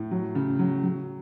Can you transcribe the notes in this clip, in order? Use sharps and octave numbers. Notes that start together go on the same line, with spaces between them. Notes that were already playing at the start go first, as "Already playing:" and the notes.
Already playing: A2
F#3
C#3
F#3
F#3